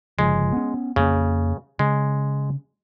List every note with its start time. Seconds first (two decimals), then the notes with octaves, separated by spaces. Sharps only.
0.19 G1 C#3 F3 G#3
0.52 B3 C#4
0.96 F2 C#3 A#3
1.79 C#3 G#3